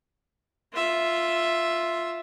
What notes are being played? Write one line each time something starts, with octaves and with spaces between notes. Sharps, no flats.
F4 E5